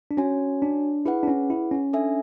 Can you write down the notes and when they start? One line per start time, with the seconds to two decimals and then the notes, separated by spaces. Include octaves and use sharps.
0.11 D4
0.17 C#4 F#4 C#5 G#5
0.62 D4
1.05 E4 G#4 B4 F#5
1.23 D4
1.28 C#4
1.50 E4
1.71 C#4
1.93 D4 A4 E5 G#5